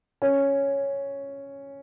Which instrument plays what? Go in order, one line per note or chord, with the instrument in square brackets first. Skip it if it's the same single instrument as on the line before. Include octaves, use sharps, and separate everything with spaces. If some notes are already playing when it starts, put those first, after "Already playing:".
[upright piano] C#4